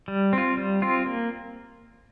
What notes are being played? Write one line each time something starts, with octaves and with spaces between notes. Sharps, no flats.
G3
C4
F4
G3
C4 F4
A#3